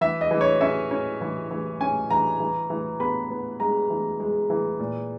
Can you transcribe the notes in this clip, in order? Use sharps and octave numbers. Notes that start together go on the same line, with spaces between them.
E3 E5
D#5
E3
C#5
C#4 E5
C#4
E3
E3
C#4 G#5
E3 A#5
E3
E3
B3 B5
B3
G#3 A#5
E3
G#3
E3
A#2